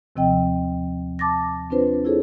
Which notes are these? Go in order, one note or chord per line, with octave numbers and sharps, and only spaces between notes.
D#2 C3 F3 C4 D#5 G5
A5 D6 A6 A#6
C4 D4 F4 B4 C5
E4 F4 G#4 A4 C5 C#5